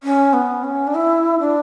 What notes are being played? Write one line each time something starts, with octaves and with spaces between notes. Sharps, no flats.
C#4
B3
C#4
D4
E4
D4